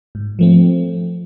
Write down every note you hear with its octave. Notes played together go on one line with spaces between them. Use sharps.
G#2
F3 A3 C4